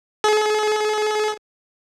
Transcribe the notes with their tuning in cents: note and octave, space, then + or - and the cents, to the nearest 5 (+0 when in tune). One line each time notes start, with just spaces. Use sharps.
G#4 +45